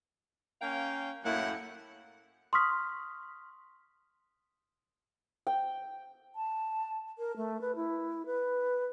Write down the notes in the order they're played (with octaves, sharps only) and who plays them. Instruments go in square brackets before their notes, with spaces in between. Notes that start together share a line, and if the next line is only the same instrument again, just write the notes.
[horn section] A#3 C#4 F5 G5
F#2 A2 A#3 E4 F#5
[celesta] C6 C#6 D#6 F6 B6
[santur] G5
[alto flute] A5
A#4
A3
B4
E4
B4